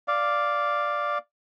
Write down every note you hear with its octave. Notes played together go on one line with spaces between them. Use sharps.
D5 F5